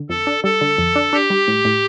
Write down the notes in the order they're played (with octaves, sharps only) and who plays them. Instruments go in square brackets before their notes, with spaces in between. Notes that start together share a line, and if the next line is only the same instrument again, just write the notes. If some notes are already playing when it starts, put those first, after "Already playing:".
Already playing: [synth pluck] D3
[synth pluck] F2 [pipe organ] A4
[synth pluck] D4
[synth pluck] G3 [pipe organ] A4
[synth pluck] D3
F2
D4
[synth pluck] D4 [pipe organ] G4
[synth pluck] G3
A2
A2